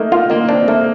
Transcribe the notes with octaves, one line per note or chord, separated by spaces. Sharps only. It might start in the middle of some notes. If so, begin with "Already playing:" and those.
Already playing: A3 A#3 D#4
A#3 F4
D#3 A#3
C4 D4
A3 A#3